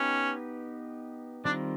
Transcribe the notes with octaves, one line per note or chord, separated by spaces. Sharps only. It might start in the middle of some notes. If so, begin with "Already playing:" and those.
Already playing: B3 C#4 D#4 G4 B4
D#3 G3 C4 D4 F4 A#4